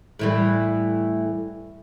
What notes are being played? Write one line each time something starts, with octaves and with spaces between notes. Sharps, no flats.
A2 E3 G3